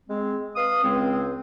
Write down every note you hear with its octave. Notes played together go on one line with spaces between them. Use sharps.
G#3 C4
B4 F5 D#6
C#2 G#3 C4